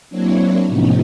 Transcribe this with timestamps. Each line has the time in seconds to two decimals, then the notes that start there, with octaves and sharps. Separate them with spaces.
0.10 F#3 A#3 C4 D4 E4 C#5
0.67 A2 C3 F3 B3 C#4 D#4